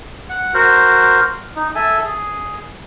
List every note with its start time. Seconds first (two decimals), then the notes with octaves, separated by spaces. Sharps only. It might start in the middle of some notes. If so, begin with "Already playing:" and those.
0.30 F#5
0.54 F#4 A#4 C5
1.56 D#4
1.75 A4 E5 G#5
2.04 G#4